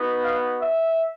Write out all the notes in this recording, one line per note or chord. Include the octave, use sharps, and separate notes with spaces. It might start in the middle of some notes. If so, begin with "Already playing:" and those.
Already playing: B3 D#4 F#4
F5
E5